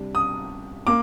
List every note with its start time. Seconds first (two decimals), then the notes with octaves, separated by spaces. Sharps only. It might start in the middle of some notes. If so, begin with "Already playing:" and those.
Already playing: C3 G3 D4
0.15 D#6
0.87 A#3 D6